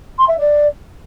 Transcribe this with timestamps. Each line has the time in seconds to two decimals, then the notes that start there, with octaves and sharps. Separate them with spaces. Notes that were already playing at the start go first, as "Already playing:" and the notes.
0.18 C6
0.28 E5
0.37 D5